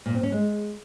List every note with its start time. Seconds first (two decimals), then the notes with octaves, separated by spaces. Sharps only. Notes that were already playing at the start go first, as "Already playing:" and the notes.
0.06 A#2
0.14 C4
0.23 C#4
0.32 G#3